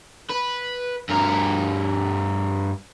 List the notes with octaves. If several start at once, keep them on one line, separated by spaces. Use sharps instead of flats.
B4
G2 A#4